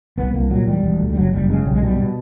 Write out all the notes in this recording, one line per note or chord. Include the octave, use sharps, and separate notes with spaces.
C2 B3
C2 A#3
A#2 F#3
E1 G3
E1
D2
G3
F#1 F#3
F#1 G3
C#3 G#3
B1 G3
G#3
B2 G3
B2